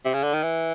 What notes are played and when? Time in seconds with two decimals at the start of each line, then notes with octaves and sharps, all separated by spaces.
0.05 C3
0.14 C#3
0.24 D3
0.33 D#3
0.43 E3